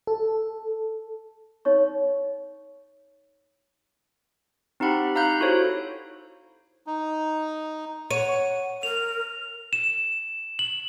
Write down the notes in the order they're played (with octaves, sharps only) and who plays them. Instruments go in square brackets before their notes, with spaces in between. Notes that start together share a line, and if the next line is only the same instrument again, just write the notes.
[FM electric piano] A4
[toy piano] D#4 C#5 C#6
[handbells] C4 D#4 G4 F#5 B5
D#4 F5 A#5 B5 F#6 G6
E4 F#4 G4 A4 C5 C#5
[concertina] D#4
[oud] C#5 [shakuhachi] F#5 [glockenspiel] D#7
[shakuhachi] A#4 [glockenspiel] F7
[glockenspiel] E7
F#7